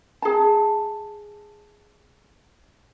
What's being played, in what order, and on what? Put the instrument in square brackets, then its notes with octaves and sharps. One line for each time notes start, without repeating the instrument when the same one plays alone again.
[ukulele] G#4 A5